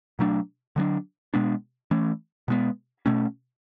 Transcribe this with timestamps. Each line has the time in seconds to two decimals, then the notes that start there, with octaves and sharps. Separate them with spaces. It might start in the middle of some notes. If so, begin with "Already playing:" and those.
0.19 B2 F#3 A3 D4
0.76 D3 F#3 B3 D4
1.34 B2 G#3 B3 D4
1.91 E3 A3 C#4
2.48 B2 G#3 B3
3.06 B2 A3 C#4